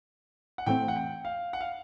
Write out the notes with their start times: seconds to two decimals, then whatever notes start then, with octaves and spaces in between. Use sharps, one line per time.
0.58 F#5
0.66 A2 E3 A3 C4 G5
0.88 F#5
0.96 G5
1.25 F5
1.53 F#5
1.61 F5